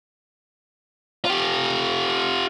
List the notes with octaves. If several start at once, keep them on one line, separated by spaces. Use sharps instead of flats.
F4 G4